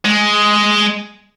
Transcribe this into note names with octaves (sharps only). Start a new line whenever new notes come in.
G#3